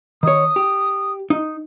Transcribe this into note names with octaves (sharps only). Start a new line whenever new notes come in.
D#3 C#5 D#6
G4
D#4